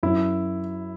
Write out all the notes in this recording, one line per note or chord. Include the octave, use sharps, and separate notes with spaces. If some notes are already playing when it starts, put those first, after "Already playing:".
F#2 F#3 E4